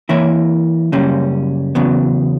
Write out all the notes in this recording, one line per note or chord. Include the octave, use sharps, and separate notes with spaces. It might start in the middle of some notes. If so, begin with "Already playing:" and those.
E3 A#3 E4 A#4 C#5
F#2 C#3 G3 A#3 C#4
E2 C#3 F#3 B3